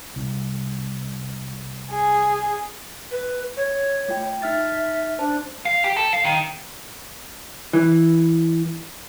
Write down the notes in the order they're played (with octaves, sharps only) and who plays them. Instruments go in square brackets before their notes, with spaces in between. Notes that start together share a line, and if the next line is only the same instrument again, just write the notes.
[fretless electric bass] C2
[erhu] G#4
[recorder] B4
C#5
[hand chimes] A3 F4 G5
[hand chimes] D#4 F6 A6 [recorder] E5
[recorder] D4 [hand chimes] C5 A5
[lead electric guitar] F5
G4
A4
F5
D#3
[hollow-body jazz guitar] E3